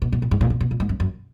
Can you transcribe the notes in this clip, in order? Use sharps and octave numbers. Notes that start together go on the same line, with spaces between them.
B2
B2
A#2
G#2
A#2
B2
B2
A#2
G#2
F#2
F#2